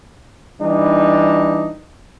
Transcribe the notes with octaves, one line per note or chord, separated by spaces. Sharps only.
E3 G3 D4 D#4